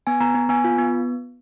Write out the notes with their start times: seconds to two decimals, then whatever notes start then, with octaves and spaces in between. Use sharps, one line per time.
0.07 B3 G#5
0.20 B3 A#5
0.35 B3
0.49 B3 G#5
0.64 F4
0.78 B3